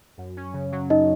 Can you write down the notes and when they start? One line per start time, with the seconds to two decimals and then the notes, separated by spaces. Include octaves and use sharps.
0.18 F#2
0.37 C#4
0.54 C#3
0.72 F#3
0.89 F#2 D#4 D#5